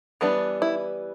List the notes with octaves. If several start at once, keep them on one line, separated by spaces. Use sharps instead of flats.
E3 G3 B3 D4
E4